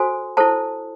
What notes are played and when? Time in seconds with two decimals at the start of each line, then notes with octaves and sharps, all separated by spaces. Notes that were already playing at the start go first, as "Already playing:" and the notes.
Already playing: F#4 A4 C5 G#5
0.37 E4 A4 C5 A5